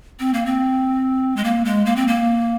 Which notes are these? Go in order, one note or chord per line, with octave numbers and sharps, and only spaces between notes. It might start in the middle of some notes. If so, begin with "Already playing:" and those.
C4
A#3
C4
G#3
A#3
G#3
A#3
C4
A#3